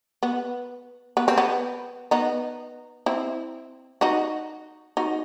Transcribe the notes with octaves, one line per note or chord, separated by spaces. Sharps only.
B3
B3
C4
B3
B3 D#4
C4 E4
D#4 F#4
D#4 F#4